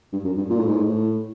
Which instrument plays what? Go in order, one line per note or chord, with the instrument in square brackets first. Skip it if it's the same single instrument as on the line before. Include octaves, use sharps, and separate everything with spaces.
[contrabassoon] G2
F#2
G2
A#2
A2
G#2
A2
A2